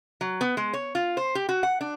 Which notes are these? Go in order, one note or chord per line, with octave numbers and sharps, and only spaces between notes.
F#3
B3
G#3
C#5
F4
C5
G4
F#4
F#5
D4